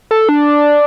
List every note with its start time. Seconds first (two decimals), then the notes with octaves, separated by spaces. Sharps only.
0.11 A4
0.29 D4